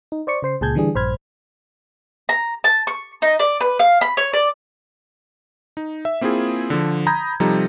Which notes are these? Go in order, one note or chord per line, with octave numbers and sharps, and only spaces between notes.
D#4
C5 D5 C#6 C#7
C#3 C5 C7
C#2 A#2 G#4 A5 G6 G#6
D3 E3 G3 D4 G#4
A#1 G2 C5 B5 F6 G#6
A#5
A5
C#6
D#4
D5
B4
F5
B5
C#5
D5
D#4
E5
A#3 C4 E4 F4 G#4
D3 F3
A#5 B5 D#6 G6 G#6
C3 F3 G3 D#4 A4 A#5